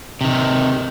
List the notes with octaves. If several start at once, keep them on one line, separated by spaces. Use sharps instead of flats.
C3 D#3